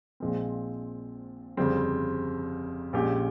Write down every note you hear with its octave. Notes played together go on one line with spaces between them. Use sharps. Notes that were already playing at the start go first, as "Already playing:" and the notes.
A#1 A#2 F3 G#3 C4
G1 F2 C#3 G3 C4
A#1 A#2 G#3 C#4 G4